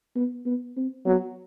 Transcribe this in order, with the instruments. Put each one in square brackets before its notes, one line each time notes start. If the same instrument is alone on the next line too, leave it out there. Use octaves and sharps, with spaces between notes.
[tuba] B3
B3
C4
[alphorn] F#3 [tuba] B3